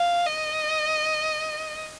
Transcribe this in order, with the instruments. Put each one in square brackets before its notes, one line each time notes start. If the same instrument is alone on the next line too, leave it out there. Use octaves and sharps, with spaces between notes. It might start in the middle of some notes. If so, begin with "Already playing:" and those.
Already playing: [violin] F5
D#5